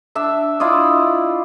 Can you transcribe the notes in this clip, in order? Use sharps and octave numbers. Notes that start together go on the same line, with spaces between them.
D4 E5
E4 F4 D5 D#5